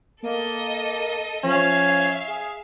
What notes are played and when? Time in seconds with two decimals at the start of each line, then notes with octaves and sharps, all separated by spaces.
0.23 A#3 A4 D#5
1.43 F3 C#4 E5 F5
2.28 G#4